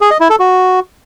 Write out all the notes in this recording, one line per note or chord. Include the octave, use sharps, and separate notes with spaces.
G#4
D#5
E4
A4
F#4